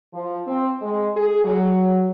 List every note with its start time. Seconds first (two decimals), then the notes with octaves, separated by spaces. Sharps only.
0.13 F3
0.47 C4
0.82 G#3
1.16 G#4
1.45 F#3